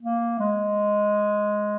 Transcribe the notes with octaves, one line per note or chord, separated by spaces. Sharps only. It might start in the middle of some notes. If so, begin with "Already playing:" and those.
A#3
G#3